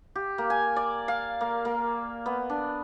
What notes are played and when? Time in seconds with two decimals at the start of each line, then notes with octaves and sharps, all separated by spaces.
0.15 G4
0.38 A#3
0.50 G#5
0.76 D5
1.08 F5
1.41 A#3
1.65 A#3
2.26 B3
2.50 D4